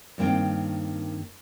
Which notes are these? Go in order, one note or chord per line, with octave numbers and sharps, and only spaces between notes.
G2 D#3 A#3 C4 G5